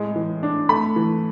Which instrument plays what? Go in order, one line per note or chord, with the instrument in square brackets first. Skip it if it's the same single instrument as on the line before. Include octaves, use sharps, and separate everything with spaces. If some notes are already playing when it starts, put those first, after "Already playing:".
Already playing: [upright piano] A2 G#3
E3
D4
A3 B5
E3